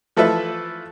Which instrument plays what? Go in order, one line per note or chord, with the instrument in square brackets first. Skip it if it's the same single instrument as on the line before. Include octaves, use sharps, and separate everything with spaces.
[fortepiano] E3 F3 A3 A4 B4 E5